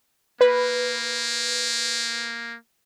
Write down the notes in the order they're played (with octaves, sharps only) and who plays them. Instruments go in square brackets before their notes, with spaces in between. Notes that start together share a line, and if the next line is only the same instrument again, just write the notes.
[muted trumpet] A#3 [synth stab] B4